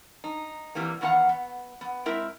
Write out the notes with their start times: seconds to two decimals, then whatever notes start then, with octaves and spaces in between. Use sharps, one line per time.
0.24 D#4
0.75 C3 E3 G3 A#3
1.01 E2 D#3 B3 F5 F#5
1.29 B3
1.81 B3
2.06 G#3 C4 E4 A#4 E5